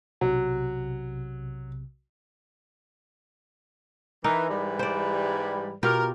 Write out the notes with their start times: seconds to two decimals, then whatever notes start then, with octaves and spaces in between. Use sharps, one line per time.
0.21 B1 C3 F#3
4.24 E3 D#4 A#4
4.48 G#2 E3 G3
4.79 C5 D5
5.83 B2 F4 G4 A#4